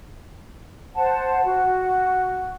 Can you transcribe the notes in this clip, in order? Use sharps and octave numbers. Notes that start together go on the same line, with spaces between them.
C5 F#5 A5
F#4